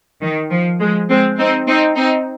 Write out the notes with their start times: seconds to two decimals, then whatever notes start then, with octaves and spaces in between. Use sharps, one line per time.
0.22 D#3
0.51 F3
0.80 F3 G#3
1.09 G#3 C4
1.38 C4 D#4
1.67 C4 D#4
1.96 C4 D#4